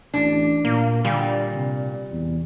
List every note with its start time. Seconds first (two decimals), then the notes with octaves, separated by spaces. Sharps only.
0.14 A1 D4
0.65 A#2 A#3
1.05 A#2 D3 G3
1.56 C3
2.12 E2